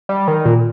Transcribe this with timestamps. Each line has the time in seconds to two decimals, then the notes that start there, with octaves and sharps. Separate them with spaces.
0.09 G3
0.28 D#3
0.45 A#2